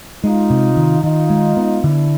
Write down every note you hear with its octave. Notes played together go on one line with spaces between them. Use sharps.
G#3 D#4 F4
C3
D#3
D#3 D#4 F4
G#3
B3
D3 D4 E4